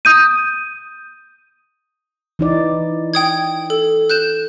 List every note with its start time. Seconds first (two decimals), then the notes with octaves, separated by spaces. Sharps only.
0.05 D#6 G6 D#7
2.39 E3 D#4 D5
3.14 G5 D#6 G#6
3.70 A4
4.10 F#6 G6 E7